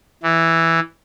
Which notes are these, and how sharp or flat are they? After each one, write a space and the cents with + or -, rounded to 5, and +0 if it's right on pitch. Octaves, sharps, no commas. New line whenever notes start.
E3 +0